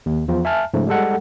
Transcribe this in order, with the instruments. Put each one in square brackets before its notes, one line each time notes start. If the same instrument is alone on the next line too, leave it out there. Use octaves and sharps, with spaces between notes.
[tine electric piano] D#2
E2 F3 F4
E5 G#5 A5 F6
G#2 C#3 F3 A3
G3 G#3 A4 F#5